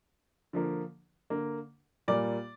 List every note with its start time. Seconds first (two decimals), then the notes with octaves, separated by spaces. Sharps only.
0.53 D3 F3 A#3
1.30 D3 A#3
2.08 A#2 G3 A#3 D5